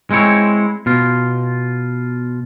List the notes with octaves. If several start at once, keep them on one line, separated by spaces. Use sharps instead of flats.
G#3 C4 E4 C#5
B2 F4